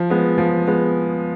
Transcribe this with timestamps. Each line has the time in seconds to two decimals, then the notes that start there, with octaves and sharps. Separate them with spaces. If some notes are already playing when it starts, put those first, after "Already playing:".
Already playing: F3
0.10 G#3 B3
0.38 F3
0.67 G#3 B3